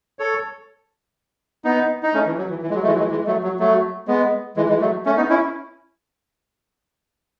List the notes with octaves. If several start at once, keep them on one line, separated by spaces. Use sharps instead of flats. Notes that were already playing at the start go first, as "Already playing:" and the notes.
A4 C#5
B3 D#4
D#4
A3 C#4
E3
F#3
E3
E3
G#3
F#3
A3
E3 G#3
F#3
E3 G#3
E3 G#3
F#3 A3
F#3
F#3 A3
G#3 B3
E3 G#3
E3 G#3
F#3 A3
A3 C#4
B3 D#4
C#4 E4